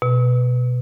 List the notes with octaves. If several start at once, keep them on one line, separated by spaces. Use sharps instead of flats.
B2